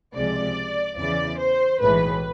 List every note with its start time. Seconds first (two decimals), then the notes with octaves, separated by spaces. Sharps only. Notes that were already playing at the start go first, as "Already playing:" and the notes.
0.14 C#2 C3 F3 G#3 D5
0.97 E2 C#3 E3 D5
1.38 C5
1.81 B1 A2 E3 G#3 B4